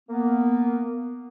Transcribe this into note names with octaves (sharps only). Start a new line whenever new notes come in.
A#3 B3